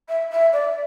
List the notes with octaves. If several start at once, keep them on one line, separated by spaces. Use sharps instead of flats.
E5
E5
D5